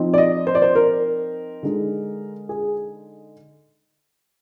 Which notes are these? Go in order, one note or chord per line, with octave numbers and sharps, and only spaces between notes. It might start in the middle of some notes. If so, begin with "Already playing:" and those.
Already playing: F3 C4 D#4
D5
D#5
C5
D5
C5
A#4
D3 G#3 D#4
G#4